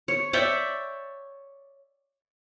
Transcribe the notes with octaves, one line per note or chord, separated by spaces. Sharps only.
C#5
C#5 D5 E5 G5